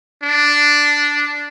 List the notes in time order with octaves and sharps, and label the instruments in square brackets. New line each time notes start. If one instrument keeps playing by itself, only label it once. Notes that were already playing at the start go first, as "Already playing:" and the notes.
[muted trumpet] D4